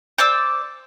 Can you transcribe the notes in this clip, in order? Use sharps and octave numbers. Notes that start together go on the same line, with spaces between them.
C5 D5 D6 E6